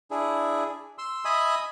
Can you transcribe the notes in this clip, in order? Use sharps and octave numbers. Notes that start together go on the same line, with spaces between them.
D4 E4 G#4
C6 E6
D#5 E5 G#5 B5 D#6